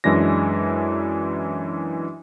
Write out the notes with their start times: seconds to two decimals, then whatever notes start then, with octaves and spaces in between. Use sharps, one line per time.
0.04 F#2 E3 G#3 D4 A#6